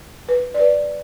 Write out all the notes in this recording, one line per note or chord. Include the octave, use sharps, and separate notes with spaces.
B4
D5
B4